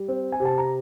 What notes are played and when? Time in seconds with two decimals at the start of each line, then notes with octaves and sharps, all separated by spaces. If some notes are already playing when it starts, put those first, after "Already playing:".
Already playing: G3
0.08 C4
0.32 G#5
0.40 C3
0.45 A5
0.58 A#5